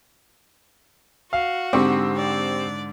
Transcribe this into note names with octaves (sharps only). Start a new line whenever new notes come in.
F#4 F5
G#2 D3 C4 G4 C#6 D6
D5